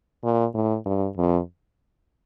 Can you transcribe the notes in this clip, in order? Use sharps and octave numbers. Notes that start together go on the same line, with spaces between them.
A#2
A2
G2
F2